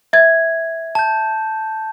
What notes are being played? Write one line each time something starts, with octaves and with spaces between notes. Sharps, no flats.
E5 G#6
A5 G6